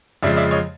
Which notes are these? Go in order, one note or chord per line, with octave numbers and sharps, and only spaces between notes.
F2 C#3 F3 G#3 D5 E5
D5 E5
C#5 D#5